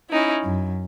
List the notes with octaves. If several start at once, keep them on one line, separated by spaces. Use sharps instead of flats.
C#4 D#4 E4
F#2